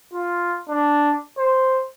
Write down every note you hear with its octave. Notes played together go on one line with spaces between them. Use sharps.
F4
D4
C5